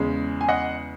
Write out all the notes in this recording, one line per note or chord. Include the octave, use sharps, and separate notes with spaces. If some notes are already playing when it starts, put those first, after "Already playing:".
Already playing: E2 C#3 G#3
G#5
D#5 F#5